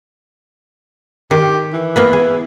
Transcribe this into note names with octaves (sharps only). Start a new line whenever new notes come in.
D#3 G4
E3
A#3 B3 B4
G#4